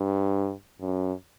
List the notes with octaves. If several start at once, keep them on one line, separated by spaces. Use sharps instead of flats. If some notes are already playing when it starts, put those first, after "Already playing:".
Already playing: G2
F#2